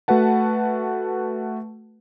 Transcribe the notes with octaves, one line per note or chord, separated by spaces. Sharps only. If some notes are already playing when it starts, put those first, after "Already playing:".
A3 F#4 B4 F#5 A5